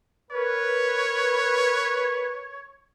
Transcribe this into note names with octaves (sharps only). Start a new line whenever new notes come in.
A#4 B4 C#5